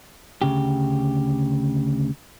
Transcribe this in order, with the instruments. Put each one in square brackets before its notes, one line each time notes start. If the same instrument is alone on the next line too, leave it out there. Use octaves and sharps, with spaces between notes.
[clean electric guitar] D2 C#3 G4